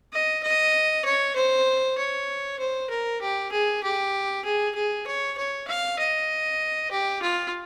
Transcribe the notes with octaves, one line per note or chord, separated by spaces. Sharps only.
D#5
D#5
C#5
C5
C#5
C5
A#4
G4
G#4
G4
G#4
G#4
C#5
C#5
F5
D#5
G4
F4